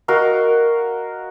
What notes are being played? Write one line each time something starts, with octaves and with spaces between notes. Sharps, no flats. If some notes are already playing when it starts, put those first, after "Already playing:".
F#4 A#4 D#5 F5